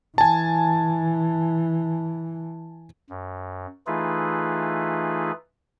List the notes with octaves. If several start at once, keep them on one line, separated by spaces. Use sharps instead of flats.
E3 G#5 A5
F#2
E3 A3 D#4 F4 G#4 B4